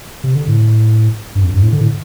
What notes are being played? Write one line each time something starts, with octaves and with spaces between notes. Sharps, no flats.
C3
D3
A2
G2
F2
G2
A2
D3
A2